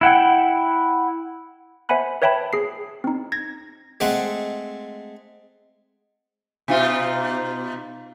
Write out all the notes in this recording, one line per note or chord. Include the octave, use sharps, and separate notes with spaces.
E4 F#5 G5
C5 E5 F#5 G#5 B5 F#6
B4 C#5 E5 G5 A5 B5
G#4 C7
C4 D#4
G#6 A#6
G#3 A3 C4 F#5
B2 D#4 F4